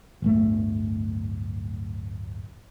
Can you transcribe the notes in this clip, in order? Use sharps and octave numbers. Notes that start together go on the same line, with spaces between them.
D1 G1 A3